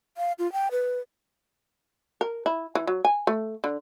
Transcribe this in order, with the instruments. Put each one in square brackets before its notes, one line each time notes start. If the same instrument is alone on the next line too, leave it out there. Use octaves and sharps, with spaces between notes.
[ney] F5
F4
G5
B4
[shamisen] A#4
E4
E3
F#3
G#5
A3
D3